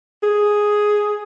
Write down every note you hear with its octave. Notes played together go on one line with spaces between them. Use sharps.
G#4